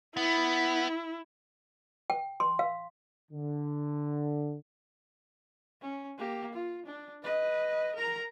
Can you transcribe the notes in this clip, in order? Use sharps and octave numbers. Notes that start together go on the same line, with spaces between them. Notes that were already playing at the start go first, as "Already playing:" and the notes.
B3 E4
G5
C6
F5
D3
C#4
A#3 G4
F4
D4
B4 D#5
A#4 A#5